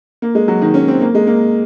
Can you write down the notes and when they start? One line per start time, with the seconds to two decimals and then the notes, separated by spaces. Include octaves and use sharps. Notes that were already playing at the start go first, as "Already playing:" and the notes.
0.22 A#3
0.35 G#3
0.48 F#3
0.62 D#3
0.74 C#4
0.88 C4
1.01 A#3
1.15 G#3
1.27 A#3